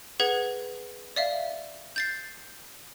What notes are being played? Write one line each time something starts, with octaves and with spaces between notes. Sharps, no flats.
G#4 B4 F#5 G#6
D5 E5 F5
G6 A6 C7